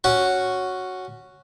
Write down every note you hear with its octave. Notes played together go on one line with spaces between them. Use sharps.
C#4 F#4 C#6